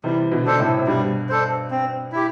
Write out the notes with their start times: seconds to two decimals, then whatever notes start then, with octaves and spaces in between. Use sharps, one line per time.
0.04 C3 E3 G3
0.31 B2 D3
0.45 D3 D4 A4 C5
0.59 A2 C3
0.79 C3
0.87 G2 B2 G3
1.29 D4 A4 C5
1.71 C4
2.12 E4 G4